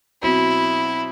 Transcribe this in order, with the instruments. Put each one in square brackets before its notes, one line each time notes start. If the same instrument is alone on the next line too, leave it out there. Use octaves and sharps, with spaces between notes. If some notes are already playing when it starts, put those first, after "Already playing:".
[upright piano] B2 F#3 C4 [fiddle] E4